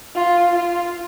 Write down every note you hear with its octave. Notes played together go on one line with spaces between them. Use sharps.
F4
F4